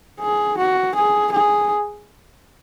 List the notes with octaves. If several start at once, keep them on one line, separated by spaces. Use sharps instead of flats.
G#4
F#4
G#4
G#4